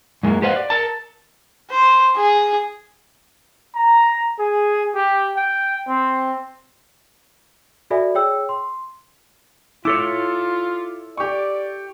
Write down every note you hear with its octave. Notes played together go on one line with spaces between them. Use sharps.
F#2 G#3 A#3 E4
G4 B4 C5 D#5 F5 F#5
D5
A#4 A5
C5
G#4
A#5
G#4
G4
G5
C4
F#4 A4 D5 E5 G#5 B5
G#4 C#5 G5 E6
C6
E4 F4 A4 C#5 D6
G4 D5 C#6